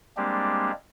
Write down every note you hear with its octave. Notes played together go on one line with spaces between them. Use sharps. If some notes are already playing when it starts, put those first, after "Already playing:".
G3 G#3 A#3 C4 D4 G4